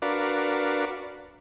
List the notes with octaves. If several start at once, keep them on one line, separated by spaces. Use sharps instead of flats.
D4 F#4 A#4 B4 D5 F5